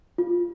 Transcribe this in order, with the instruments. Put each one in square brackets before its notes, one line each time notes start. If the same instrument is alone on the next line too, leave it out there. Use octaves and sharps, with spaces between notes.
[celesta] F4